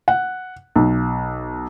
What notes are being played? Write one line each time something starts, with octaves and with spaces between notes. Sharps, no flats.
F#5
B1